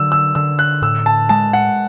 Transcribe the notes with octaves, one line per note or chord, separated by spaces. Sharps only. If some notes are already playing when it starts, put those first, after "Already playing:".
Already playing: D3 F#3 E6
E6
D3 E6
F#6
A2 E6
A5
G#3 A5
F#5